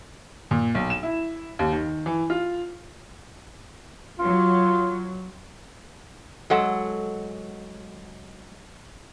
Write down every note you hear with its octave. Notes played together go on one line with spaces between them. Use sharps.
A#2
B1
E7
E4
D#2
D#3
E3
F4
F#3 F4
F#3 G#3 A4 F#5